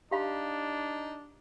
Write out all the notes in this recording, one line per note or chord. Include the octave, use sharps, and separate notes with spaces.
D4 D#4 G4 F5 B5